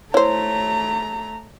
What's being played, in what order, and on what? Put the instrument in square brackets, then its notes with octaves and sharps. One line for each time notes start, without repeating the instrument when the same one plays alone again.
[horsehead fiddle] A3 A#5 [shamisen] E4 C5 [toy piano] C#5